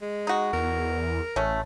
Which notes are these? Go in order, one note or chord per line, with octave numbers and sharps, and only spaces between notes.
G#3
D#4 F#4
E2 A#4
A1 A3 C#4